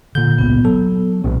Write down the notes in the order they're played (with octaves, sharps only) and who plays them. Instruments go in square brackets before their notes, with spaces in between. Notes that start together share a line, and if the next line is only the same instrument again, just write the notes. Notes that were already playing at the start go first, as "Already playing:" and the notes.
[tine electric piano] A#2 G6 [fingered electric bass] D3
[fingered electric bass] G#1 C#2 C#4 [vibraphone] B3
[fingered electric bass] F#3 [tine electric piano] A4
[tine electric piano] B1 [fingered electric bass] A#2 A#3 C#4